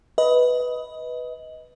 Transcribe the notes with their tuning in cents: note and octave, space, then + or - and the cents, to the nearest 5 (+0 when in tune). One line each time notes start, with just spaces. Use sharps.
B4 +0 D#5 +20